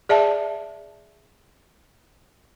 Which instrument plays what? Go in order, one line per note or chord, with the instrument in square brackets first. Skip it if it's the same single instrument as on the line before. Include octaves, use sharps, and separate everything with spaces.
[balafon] G#4 D5 E5 A5